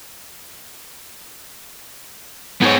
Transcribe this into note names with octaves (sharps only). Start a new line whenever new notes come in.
G#2 B3 C#5